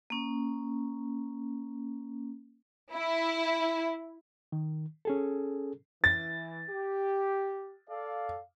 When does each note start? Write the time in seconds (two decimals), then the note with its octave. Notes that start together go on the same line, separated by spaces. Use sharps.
0.10 A#3 C#4
2.92 E4
4.52 D#3
5.05 C#4 G#4 A4
6.04 E3 A6
6.70 G4
7.90 A4 D5 F5